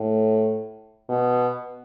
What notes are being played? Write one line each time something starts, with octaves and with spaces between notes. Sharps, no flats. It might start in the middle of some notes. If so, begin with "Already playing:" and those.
Already playing: A2
B2